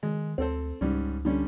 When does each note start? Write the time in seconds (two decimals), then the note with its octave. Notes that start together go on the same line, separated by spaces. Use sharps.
0.03 D#3 G#3
0.38 D2 C4 A4 C5
0.81 C#2 G#2 G3 C#4
1.25 D3 G3 C#4